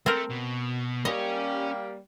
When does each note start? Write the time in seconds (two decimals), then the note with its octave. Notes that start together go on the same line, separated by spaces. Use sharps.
0.06 A3 C4 A#4
0.30 B2
1.05 G3 A#3 C#4 D#5